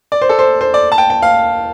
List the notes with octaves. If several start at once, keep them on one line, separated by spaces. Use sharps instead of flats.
D5
C5
A4
C5
C5
D5
A5
G5
G5
F5